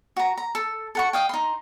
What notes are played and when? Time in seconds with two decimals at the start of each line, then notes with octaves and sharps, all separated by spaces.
0.16 F#4 A#5
0.37 A#5
0.55 A4
0.95 A4 F#5 C#6
1.13 D#5 F5 G5
1.29 D#4 C6